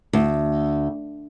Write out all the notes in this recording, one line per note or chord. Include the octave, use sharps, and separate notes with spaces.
D2